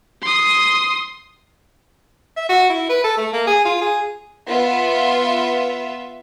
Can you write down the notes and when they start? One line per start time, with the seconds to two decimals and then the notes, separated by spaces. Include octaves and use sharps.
0.22 C6 D#6
2.37 E5
2.49 F#4
2.69 E4
2.89 B4
3.04 A4
3.17 A3
3.33 A#3
3.47 G#4
3.65 F4
3.81 G#4
4.47 B3 F4 E5